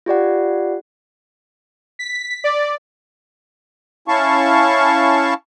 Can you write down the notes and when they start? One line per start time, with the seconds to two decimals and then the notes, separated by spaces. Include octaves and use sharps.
0.06 F4 G4 D5 F#5
1.99 B6
2.44 D5
4.08 C#4 E4 F5 A5 C#6